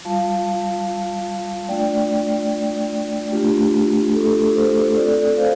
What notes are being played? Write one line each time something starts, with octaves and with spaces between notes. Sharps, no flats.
G3 F4 F5 A5
A3 D4 F4 D5 G5
A3 D4 F4 G4
A4
A4
G4 C5
A3 C4 F4 A4 D5
C5 F5